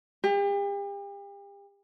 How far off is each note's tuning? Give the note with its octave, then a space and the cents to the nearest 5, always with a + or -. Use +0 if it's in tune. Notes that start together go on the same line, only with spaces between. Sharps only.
G4 +40